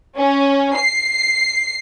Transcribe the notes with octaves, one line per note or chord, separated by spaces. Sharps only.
C#4
C7